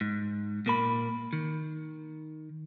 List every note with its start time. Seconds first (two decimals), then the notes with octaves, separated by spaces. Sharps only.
0.01 G#2
0.66 A#2 A#3 B5
1.33 D#3